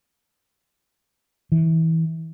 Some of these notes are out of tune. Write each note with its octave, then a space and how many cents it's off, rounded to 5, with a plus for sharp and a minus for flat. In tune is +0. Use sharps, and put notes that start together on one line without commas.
E3 -25